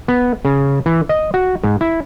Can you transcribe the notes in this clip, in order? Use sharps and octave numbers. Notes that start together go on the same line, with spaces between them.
B3
C#3
E3
D#5
F#4
G#2
E4